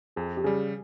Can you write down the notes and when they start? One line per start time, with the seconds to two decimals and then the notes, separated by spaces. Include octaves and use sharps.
0.16 F2 G#4
0.37 G4
0.44 C#3 G3 G#4